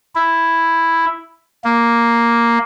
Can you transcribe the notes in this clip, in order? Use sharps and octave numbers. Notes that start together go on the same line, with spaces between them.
E4
A#3